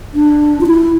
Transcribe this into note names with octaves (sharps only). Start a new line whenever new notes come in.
D4
F4
E4